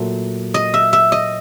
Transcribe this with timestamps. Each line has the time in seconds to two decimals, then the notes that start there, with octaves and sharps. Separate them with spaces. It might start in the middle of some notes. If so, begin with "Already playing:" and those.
Already playing: A#2 F#3 A3
0.54 D#5
0.74 E5
0.93 E5
1.12 D#5